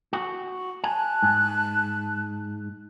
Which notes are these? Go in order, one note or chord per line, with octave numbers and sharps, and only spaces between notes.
F#4
G#5 A5 F#6
G#2